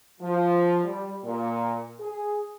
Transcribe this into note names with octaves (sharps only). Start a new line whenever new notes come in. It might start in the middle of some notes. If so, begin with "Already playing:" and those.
F3
G3
A#2
G#4